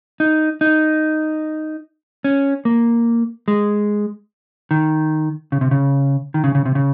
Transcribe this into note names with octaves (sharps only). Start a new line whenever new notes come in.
D#4
D#4
C#4
A#3
G#3
D#3
C#3
C3
C#3
D#3
C#3
C#3
C3
C#3